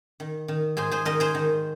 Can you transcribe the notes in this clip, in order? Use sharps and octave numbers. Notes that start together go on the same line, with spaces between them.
D#3
D#3
G#2 G#4 C5
G#4 C5
D#3 A#4 D#5
G#4 C5
D#3